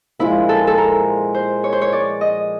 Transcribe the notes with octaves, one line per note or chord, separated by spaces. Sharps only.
A#2 F3 G#3 E4
A4
A4
A#4
C5
C#5
C5
C#5
D5
D#5